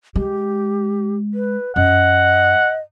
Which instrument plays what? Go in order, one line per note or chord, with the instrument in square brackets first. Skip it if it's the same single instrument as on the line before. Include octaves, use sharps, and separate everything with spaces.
[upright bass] G#3 [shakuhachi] G4
[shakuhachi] B4
[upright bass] F#2 [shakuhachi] D#5 [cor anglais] F#5